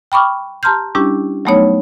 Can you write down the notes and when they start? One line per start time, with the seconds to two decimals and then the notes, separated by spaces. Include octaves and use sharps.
0.12 G5 B5 C#6 D6 F6
0.63 G4 A5 A#5 C6 F6 G6
0.95 G3 C#4 D4 E4 G4
1.45 F#3 G3 A3 B3 D#4 C#5